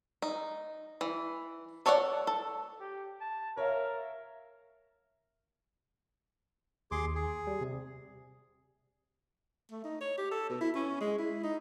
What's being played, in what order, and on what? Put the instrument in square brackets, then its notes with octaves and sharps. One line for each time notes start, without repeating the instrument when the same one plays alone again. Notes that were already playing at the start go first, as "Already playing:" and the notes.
[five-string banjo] D#4
E3
A4 C#5 D5 F5 F#5
A4
[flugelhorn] G4
A5
[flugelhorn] A#4 [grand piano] C#5 E5 F5
[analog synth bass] D#2 [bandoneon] G#4 C6 D6
[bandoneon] G#4
[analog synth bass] G3
C3
[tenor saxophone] A3
D#4
C#5
G4
A4
B2
E4
C#4
G#3
E4
D#4